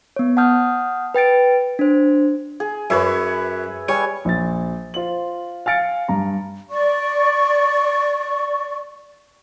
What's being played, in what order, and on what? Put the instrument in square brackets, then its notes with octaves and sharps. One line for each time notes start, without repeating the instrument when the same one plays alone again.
[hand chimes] B3 C#5
F#5 A5 D#6 F6 G6
B4 G5 A6 D7
D4 C5
[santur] G#4
[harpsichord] F#2 [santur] B4 C#5 E5
[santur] G3 G#5 [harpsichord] C#5
[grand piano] A#1 A6
F4 C5 F#7
F5 G#5 F6 A6 C#7 D7
G2 A#5
[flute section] D5 C#6